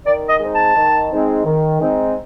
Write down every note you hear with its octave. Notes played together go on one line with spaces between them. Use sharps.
D#3 D5
D#5
G#3 C4 D#4
A5
D#3
G#3 C4 D#4
D#3
G#3 C4 D#4